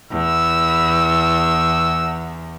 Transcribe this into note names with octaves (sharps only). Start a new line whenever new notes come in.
E2 E6